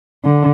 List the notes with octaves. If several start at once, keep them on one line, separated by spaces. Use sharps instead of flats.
D3